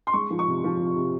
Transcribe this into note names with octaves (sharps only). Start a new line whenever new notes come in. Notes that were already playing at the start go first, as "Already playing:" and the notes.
C6
G#3 C#6
F3
C#6
C3
F3
C3
C3